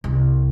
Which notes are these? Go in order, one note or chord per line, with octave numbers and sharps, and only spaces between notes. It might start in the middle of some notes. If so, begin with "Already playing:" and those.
C2